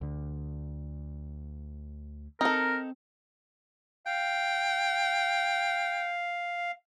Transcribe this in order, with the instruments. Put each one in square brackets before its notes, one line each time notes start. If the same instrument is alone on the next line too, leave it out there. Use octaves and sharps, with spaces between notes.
[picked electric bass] D2 D3
[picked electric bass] C4 [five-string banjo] D#4 A4 [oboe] A#4
[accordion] F5 [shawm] G5